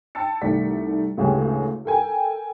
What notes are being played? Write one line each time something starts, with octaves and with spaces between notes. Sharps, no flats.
G5 A5 E6 A6 C#7
C2 D#3 A3 D5 B6
A1 D2 C#3 G#3 G4 G#4
A4 A#4 G5 G#5